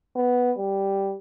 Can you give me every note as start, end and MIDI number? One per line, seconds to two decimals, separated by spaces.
0.16 0.52 59
0.58 1.16 55